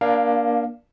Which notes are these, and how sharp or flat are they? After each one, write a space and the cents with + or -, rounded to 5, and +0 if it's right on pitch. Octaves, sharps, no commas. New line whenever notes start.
A#3 +20 D4 -5 F5 -5